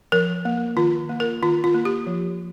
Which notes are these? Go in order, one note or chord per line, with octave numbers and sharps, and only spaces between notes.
F3 A#4
A#3
D#3 F4
A#3
A#4
D#3 F4
F4
A#3
G4
F3